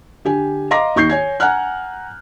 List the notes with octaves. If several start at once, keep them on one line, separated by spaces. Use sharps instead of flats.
D3 G4 G#5
D#5 F5 A#5 C6 D6 A#6
D#2 D#4 C#6 G6 C7
C#5 G#5 G#6
F#5 G#5 A#5 F6 F#6